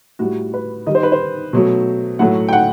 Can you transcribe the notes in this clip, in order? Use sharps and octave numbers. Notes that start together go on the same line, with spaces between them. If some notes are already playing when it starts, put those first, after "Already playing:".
A2 G3 F#4
B4
D#3 G3 D#5
C5
B4
C5
B2 F#3 A3
A2 F#3 A3 F#5
G5
F#5